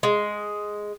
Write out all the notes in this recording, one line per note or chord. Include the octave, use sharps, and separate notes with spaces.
G#3